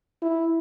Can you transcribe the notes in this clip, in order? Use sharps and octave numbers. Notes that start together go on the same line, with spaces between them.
E4